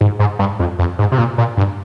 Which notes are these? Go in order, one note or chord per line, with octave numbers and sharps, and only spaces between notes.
G#2
G#2
G2
F2
F2
G#2
C3
A#2
A#2
G2